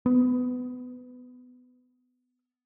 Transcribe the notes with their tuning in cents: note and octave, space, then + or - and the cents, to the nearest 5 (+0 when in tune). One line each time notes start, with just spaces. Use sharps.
B3 +20